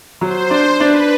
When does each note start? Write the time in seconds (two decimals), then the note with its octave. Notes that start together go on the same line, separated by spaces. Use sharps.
0.21 F#3 C5
0.50 D4
0.80 D4 B4